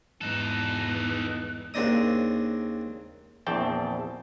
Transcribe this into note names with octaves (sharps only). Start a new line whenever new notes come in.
E2 G#2 D#4 A4 F#6
D#2 C#3 C4 D4 D#4 D#6
A#1 E2 C4 G5 A5